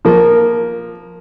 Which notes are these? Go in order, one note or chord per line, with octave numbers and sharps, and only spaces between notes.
F3 A#3